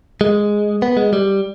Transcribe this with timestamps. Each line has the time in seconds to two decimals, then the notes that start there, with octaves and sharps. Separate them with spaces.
0.21 G#3
0.82 B3
0.97 G#3
1.13 G3